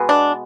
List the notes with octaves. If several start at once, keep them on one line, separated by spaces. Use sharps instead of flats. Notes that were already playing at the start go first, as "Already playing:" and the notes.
Already playing: B2 G#3 B3
D4